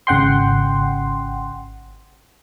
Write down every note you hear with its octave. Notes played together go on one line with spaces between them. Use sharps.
G#1 C#3 F#5 G5 C6